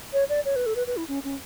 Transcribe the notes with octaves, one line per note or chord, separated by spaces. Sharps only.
C#5
D5
C#5
B4
A4
B4
B4
E4
C#4
C#4